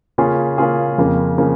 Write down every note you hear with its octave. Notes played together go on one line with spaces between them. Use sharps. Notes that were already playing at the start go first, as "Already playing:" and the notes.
C#3 A#3 C#4 F4 G#4
C#3 A#3 C#4 F4 G#4
F2 C#3 F3 A#3
C#3 F3 A#3